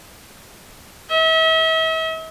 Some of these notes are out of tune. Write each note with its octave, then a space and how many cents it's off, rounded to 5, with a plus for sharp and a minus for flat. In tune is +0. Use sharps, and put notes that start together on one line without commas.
E5 -40